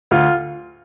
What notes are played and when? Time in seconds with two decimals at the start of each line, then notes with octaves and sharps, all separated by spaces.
0.11 D2 F4